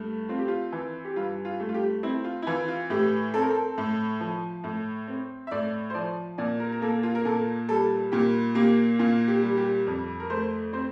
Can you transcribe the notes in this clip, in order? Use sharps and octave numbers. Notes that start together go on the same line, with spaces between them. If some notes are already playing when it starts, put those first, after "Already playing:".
Already playing: G2 A3
C4 F4
G4
F4
E3
G4
G2 F4
F4
A3
F4
G4
C4 E4
F4
E4
E3 F4
F4
A2 G4
C4 A4
A#4
A4
A2
F3
A2
C4
E5
A2 D5
C5
F3 D5
A#2 D5
A#4
A#4
A#3 A4
F4
A#4
A#2 A4
G3 A4
A#2 G4
A#3 G4
A#2 F4
G4
G3
G4
F2
A#4
A3 C5
C4 C5